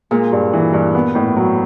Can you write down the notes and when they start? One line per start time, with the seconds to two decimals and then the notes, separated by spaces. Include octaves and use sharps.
0.11 A#2 G#3
0.32 G2
0.53 E3
0.73 G2
0.95 B3
1.15 A2
1.36 F#3